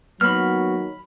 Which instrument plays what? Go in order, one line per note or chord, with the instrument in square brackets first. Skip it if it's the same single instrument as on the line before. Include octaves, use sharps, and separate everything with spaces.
[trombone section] D#3 F#3 [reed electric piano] A#3 [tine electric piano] B3 F#4 [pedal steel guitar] B5 F6